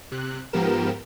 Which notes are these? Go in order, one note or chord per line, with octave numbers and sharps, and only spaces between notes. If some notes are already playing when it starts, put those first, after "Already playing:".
C3 F#6
G#2 F3 B3 G4 A#4 E7